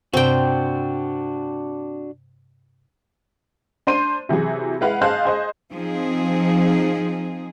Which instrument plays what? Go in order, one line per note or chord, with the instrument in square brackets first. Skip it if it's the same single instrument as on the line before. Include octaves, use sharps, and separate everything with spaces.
[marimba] G2 C3 [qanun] C4 G5 [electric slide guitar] D4 F#4
[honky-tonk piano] D4 C5 C6 D#7
C3 E3 F#3 G#4
G#3 E4 B4 F5 F#5
G#4 C5 D#5 F5 A5 F#6
G#4 C5 D#5
[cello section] F3 C4 D#4 G#4